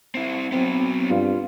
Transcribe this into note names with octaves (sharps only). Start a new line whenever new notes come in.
C4 E4
F#3 B3 C4
G2 F4